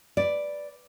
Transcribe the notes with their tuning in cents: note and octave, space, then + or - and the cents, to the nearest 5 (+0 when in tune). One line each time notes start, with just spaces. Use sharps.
B4 +0 D5 +0